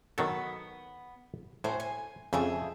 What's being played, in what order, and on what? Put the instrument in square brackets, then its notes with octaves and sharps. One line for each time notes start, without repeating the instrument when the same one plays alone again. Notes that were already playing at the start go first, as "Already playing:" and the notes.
[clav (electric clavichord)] D#3 F#3 A4 [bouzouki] B3
[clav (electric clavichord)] A2 [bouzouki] C#4 F#4 C5
[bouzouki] G#5
[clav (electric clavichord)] F2 C#3 [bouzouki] F3 G#4 E5